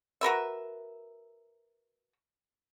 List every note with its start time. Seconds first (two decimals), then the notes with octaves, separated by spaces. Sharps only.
0.21 F#4 A#4 B4 E5